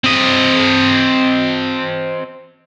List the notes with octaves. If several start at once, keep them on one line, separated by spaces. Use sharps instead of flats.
C4 D#5